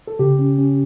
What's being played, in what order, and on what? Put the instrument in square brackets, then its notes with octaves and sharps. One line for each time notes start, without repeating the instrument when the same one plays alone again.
[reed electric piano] A4
C#3 G4
C#4
C#4